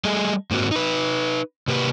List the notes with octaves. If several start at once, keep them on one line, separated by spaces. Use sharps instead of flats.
G3 A3 G#4 D#5
G#2 A#3 C4 F#4
D#4 B4
C3 A#3 G4 B4